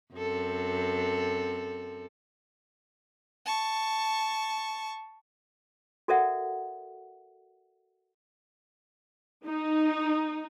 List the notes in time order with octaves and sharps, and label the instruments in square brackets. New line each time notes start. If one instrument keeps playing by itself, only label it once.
[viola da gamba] F#2 C4 A4
[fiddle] A5 C#6
[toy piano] F#4 A4 A#4 D5 E5 F#5
[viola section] D#4